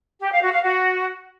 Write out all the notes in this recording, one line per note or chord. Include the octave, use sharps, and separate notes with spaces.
G4
F5
F#4
F5
F#4